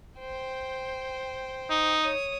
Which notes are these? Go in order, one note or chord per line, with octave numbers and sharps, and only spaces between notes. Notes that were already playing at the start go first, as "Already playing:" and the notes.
C5 G5
D#4
C#5 D#6